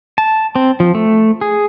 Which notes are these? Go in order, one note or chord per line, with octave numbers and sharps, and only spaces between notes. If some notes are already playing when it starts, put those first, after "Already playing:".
A5
C4
F3
A3
G#4